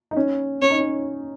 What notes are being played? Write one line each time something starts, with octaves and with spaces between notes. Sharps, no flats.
D#4
C#4
C#4 C#5
D#4
C#4